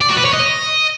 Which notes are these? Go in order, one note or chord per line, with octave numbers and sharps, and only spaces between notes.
D5
F#4
B4
C#5
D#5